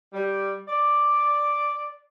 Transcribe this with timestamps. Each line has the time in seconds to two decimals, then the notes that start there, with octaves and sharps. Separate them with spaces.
0.13 G3
0.67 D5